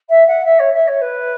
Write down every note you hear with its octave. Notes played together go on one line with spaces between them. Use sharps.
E5
F#5
E5
C#5
E5
C#5
B4